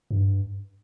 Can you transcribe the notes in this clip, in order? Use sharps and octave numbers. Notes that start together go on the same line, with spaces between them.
G2